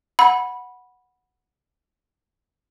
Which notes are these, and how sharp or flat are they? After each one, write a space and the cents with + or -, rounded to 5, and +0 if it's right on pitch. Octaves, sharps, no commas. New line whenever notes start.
F#5 -5 B5 -10